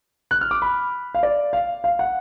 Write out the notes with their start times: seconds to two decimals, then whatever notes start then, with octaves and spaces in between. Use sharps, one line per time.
0.31 F#6
0.41 F6
0.51 D6
0.62 B5
1.15 F5
1.23 D5
1.53 F5
1.84 F5
1.99 F#5